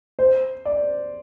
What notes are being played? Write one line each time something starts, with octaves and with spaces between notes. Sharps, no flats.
C5
D5